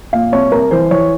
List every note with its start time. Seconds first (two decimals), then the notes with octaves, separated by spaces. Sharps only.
0.13 A#2 F5
0.32 C2 C#5
0.52 C2 A#4
0.71 E3 C5
0.91 E3 C#5